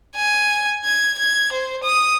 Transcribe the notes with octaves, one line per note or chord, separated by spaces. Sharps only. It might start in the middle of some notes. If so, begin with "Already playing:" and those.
G#5
G#6
G#6
C5
D#6